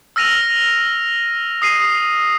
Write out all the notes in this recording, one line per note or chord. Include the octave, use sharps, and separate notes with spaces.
E6 F6 A#6 D#7 F7
D#6 C7 D#7